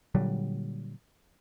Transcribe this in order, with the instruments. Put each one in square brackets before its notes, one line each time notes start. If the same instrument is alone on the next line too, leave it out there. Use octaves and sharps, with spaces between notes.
[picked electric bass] A#2 D3 F#3 G3